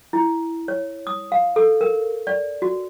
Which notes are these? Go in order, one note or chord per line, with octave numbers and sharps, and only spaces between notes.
E4
C#5
D#6
F5
A4
A#4
D5
F#4